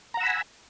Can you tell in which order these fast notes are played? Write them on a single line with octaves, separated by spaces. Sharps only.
A#5 F#5 E6 B5 G#5